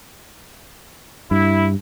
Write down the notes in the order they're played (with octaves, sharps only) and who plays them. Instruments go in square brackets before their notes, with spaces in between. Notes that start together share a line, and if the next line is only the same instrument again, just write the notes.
[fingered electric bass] G2 [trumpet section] E4